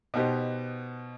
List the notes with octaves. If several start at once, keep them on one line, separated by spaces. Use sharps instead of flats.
B2 B3 D#4 G4 C5